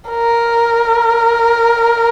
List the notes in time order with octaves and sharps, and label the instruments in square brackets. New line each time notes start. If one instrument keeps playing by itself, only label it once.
[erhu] A#4